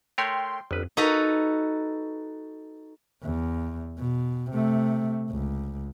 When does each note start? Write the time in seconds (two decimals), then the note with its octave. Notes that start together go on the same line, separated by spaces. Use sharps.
0.18 A3 A#4 C#5 G5 C6
0.71 G1 F2 B4
0.97 D#4 F#4 A4 B4 A#5
3.23 E2
3.98 B2
4.51 C3 A3
5.30 C#2